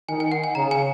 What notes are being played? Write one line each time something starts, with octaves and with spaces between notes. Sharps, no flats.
D#3 G#5
G#5
F#5
G#5
C#3 A#5
G#5